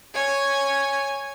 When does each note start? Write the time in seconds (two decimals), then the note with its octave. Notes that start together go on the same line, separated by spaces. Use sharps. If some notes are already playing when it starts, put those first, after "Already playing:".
0.14 C#5 G#5